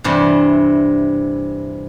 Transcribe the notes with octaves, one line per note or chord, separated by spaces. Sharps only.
G2 C3 E3